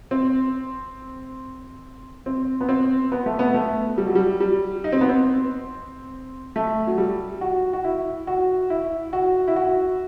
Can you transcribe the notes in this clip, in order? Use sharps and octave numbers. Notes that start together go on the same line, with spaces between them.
C4
C4
B3
C4
B3
A3
B3
A3
G3
F#3
G3
G3
D#4
C4
B3
C4
A3
F#3
G3
F#4
F#4
E4
F#4
E4
F#4
E4
F#4